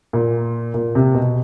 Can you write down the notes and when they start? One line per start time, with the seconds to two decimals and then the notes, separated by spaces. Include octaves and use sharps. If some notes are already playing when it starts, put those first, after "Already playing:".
0.13 A#2
0.74 A#2
0.95 C3
1.15 B2